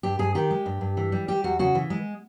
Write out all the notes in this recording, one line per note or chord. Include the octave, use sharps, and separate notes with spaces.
G2 G4
G2 G#4
D#3 G4
G#3
G2
G2
E3
G3
G3 G4
E2 F#4
C#3 F#4
E3
G#3